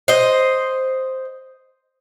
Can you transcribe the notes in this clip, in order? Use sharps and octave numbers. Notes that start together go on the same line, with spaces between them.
C5 D#5